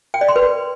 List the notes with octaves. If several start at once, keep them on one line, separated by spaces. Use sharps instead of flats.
G5
D5
C6
B4